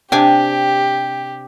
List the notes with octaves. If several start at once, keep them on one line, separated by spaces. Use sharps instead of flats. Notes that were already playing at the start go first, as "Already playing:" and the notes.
C3 D4 G4 G5 G#5